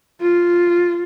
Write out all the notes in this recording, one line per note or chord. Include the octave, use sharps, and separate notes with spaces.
F4